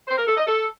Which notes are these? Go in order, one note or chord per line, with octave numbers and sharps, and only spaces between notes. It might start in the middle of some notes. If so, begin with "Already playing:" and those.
C5
A#4
A4
D#5
A4